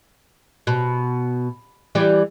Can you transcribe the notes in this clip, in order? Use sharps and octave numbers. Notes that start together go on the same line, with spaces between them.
B2
E3 G3 G4